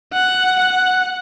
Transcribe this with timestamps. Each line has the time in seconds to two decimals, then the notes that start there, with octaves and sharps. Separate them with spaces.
0.13 F#5
0.60 F#5